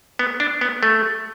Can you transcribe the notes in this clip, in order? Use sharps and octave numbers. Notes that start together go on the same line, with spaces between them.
B3
D4
B3
A3